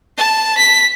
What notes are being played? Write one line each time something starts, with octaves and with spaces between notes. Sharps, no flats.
A5
B6